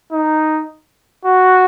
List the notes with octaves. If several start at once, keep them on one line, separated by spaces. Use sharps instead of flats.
D#4
F#4